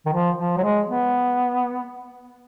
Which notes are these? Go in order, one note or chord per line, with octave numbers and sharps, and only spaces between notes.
D#3
F3
F3
F#3
G#3
B3